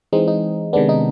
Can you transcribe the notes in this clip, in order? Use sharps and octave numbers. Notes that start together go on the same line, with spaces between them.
E3 G#3 C4 D#4
D#4
C3 D#3 G#3 B3 D4
D#4